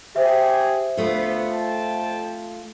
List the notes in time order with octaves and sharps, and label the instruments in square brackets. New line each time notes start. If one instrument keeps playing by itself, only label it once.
[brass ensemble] G4 G#4 [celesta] C5 E5
[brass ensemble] D2 B3 [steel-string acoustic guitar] A3 F4
[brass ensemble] F2 G5 A5